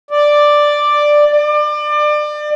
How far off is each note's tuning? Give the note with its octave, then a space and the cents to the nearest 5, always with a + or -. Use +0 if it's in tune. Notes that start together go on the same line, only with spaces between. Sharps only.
D5 +5
D5 +30